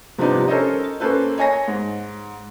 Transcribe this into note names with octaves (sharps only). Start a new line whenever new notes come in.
C3 F3 G3 B3 D4 D#4
C#4 A4 A#4 C5 C#5 D#5
A#3 C#4 A4 B4 C5
C#5 D#5 G#5 C#6 A#6
G#2